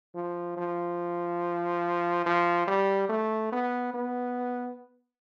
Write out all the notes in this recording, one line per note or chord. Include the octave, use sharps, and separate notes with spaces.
F3
F3
F3
G3
A3
B3
B3